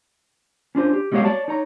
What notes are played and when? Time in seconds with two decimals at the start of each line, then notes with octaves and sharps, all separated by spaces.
0.75 C#4 D4 F4 C5
0.93 G4
1.12 G3 G#3 B3 F#4 C#5 F5
1.25 C#5 D5 A5
1.48 D#4 C#5 A#5